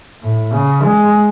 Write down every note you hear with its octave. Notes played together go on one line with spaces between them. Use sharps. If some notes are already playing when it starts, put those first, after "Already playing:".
A2
C#3
G#3